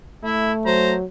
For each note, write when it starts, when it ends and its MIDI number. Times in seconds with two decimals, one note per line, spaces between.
0.24 0.97 57
0.24 0.52 64
0.66 1.05 54
0.66 0.95 72
0.66 0.93 82